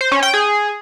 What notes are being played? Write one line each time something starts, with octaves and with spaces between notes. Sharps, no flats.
C5
C#4
G5
G#4